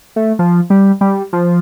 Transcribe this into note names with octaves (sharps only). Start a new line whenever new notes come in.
A3
F3
G3
G3
F3